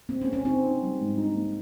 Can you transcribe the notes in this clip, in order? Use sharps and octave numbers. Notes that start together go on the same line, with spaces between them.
A#3 C4
C#4
A#3
C#4
C4 D#4
D#4
G3
G#2
D#4
A#3